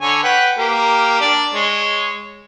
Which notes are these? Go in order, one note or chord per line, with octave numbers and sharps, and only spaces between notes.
D3 C#5 G#5
B4 F#5 G5
A#3 G4 A#4
D4 D5
G#3 C#5